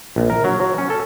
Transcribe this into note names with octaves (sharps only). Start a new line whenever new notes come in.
A#1
A#4
F#3
F#3
C#4
A4